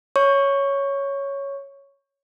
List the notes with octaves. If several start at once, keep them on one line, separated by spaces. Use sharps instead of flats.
C#5 C#6